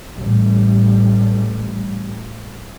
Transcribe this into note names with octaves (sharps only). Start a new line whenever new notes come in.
A1 G3